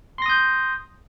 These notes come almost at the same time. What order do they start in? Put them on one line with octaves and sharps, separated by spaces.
C6 A#6 D#6 G6